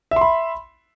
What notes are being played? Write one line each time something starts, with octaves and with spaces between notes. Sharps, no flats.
E5 B5 C6